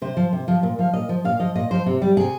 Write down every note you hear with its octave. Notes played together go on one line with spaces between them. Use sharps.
C3 C5
F3
C3
F3
A#2
F3 F5
A#2 D#5
F3
A#2 F5
F3 D#5
A#2 D#5
F3 C5
C3
G3
C3 G#4